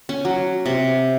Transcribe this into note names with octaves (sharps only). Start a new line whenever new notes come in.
C#4
F#3
C3